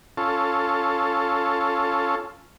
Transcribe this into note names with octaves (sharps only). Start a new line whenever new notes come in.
C#4 F4 A4